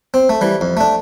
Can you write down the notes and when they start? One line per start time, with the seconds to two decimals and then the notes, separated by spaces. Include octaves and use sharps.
0.14 C4
0.29 A3
0.41 E3 G3
0.61 F2
0.77 A3 D4